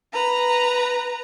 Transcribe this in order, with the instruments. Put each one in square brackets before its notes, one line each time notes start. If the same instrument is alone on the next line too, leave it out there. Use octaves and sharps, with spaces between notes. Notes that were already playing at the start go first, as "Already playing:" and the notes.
[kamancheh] B4 A#5